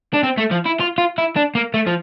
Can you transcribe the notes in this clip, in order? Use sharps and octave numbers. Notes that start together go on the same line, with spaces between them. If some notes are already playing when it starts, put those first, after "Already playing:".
D4
C4
A3
F3
E4
F4
F4
E4
D4
A#3
A3
F3